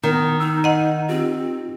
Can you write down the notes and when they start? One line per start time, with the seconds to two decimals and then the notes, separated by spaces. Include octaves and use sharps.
0.03 D#3 B3
0.40 D#4 A#5 E6
0.64 D#5 F#5
1.09 C4 F4 G4